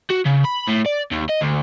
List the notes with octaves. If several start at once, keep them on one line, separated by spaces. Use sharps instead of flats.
F#4
C#3
B5
A2
D5
D#2
D#5
D2